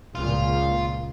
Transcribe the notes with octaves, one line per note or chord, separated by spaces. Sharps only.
C#2 A#2 F4